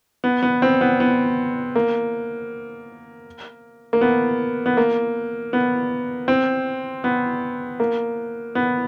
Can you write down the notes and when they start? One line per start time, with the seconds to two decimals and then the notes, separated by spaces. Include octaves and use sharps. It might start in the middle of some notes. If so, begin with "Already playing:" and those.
0.24 B3
0.43 B3
0.62 C4
0.81 B3
1.00 B3
1.75 A#3
3.93 A#3
4.01 B3
4.66 B3
4.77 A#3
5.53 B3
6.28 C4
7.04 B3
7.80 A#3
8.55 B3